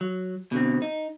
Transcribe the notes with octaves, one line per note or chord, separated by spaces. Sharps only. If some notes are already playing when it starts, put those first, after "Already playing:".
F#3
B2 D3 C4
D#4